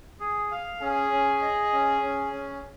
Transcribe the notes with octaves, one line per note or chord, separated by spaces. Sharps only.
G#4
F5
C#4 G#4
C#4
D#5
C#4
C#4
C#4